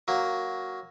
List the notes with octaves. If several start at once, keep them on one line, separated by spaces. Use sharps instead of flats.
F#3 A#3